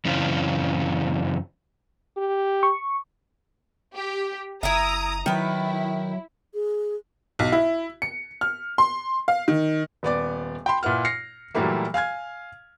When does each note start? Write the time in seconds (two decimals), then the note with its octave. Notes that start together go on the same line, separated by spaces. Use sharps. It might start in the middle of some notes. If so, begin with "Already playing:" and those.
0.05 F#2 C#3 E3 C4 F4
2.17 G4
2.63 C#6
3.95 G4
4.63 F#1 E4 E5 A#5 D#6
5.26 D#3 F#3 E4 B4
6.54 G#4
7.39 B1
7.52 E4
8.02 C#7
8.41 F6
8.78 C6
9.28 F5
9.48 D#3
10.03 D#1 B3 D5 D6
10.66 G5 B5 C6
10.83 A#2 E4 B4 F#5 F6
11.05 F6 A#6 C7 C#7
11.55 A#2 E3 F#3 G3 A3 A#3
11.94 F5 G#5 F6 G#6